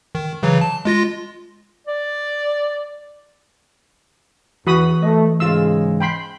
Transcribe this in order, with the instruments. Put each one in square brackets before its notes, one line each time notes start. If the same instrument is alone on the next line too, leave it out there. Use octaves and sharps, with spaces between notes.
[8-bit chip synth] D#3
C#3 E3 F#3
A5
G#3 F4 A#6
[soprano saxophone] D5
[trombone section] E2 [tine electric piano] E3 [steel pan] F#4 B5 D#6
[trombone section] A3 [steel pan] D#5
[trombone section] G#2 C#3 G#3 [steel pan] F4 E6
[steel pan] G5 B5 C6